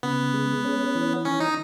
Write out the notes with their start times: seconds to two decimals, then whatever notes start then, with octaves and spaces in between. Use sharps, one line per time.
0.03 C#3 B3
0.34 G#3
0.65 C#4
0.95 E3
1.25 D#3 C#4
1.40 D#4